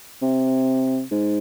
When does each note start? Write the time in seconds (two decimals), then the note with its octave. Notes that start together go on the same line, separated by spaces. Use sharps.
0.22 C3
1.11 G#2